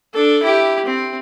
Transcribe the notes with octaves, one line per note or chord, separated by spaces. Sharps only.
D4 A4
E4 G4
C4